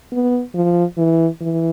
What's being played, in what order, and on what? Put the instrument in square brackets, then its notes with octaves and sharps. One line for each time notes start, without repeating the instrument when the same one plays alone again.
[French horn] B3
F3
E3
E3